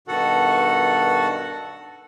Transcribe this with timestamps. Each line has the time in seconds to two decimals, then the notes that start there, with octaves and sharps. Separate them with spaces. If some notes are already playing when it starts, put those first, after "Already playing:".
0.08 G2 B2 D#3 F#4 A4 F#5